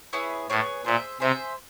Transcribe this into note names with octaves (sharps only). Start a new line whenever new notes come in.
B3 E4 G#4 C#5
A2 B3 E4 G#4 C#5
A#2 G#4 C5 E5
C3 G#4 C5 E5